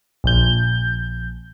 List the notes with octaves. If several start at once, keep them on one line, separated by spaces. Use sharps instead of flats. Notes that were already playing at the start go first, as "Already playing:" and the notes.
A#1 G6